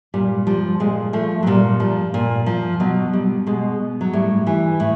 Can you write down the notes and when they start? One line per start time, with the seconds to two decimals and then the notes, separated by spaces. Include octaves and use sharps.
0.14 A#2 G3
0.47 F3 G3
0.80 A#2 G#3
1.13 F3 A3
1.43 F#3
1.47 A#2 G3
1.80 F3
2.14 A#2
2.46 F3
2.80 B2 F#3
3.13 G3
3.47 B2 G#3
4.01 F#3
4.13 A2 G3
4.47 E3
4.80 A2